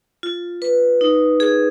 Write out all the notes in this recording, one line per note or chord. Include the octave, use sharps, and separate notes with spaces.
F4
B4
D#4
G#4